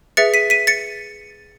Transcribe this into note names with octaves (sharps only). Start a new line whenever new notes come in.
G#4 B4 E5 A6 C#7
B6 D#7
B6 D#7
A6 C#7